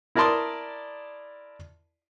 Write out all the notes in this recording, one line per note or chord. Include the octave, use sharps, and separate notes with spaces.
E4 A#4 D5 A5 C6 D#6